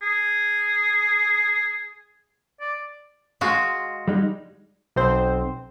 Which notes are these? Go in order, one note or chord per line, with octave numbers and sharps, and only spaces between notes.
G#4
D5
G#3 F4 F#4
G3 G#3 D#4
B1 C4 C5